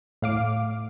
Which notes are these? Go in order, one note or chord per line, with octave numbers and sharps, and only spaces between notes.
A2 F5 D6